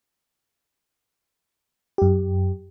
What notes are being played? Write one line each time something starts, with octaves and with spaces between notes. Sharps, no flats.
F#2 G4